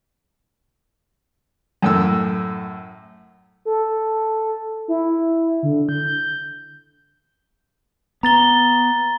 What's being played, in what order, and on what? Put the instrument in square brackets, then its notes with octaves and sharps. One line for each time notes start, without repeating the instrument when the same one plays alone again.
[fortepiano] F#2 A2 E6
[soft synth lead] A4
E4
D3
G6
[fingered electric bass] B3 [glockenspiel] A#5 A6 G7